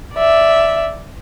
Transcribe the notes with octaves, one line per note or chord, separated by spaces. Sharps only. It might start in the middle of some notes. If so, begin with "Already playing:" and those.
D5 E5